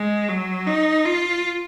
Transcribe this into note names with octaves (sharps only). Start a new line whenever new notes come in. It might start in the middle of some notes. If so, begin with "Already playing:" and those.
Already playing: G#3
F#3
D#4
F4